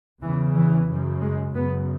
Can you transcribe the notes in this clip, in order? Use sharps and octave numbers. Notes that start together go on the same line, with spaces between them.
E2 C#3 E3
E3
F#2 C#3
G#3
F#2 C#3 B3